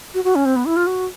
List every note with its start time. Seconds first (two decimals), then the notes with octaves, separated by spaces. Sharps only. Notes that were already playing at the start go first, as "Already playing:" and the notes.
0.14 F#4
0.24 F#4
0.35 C#4
0.46 C4
0.56 B3
0.66 E4
0.76 F4
0.87 F#4